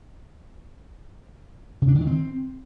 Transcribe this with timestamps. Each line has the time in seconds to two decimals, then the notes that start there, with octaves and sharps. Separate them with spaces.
1.82 C#3
1.88 D4
1.94 D3
2.01 D#3
2.07 C4